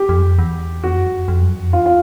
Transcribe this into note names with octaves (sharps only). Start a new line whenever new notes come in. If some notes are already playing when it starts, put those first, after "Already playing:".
Already playing: G4
F2
F#2
F2
E2
F2 F#4
F#2
F2
F2
F#2
F2
E2 F4
F4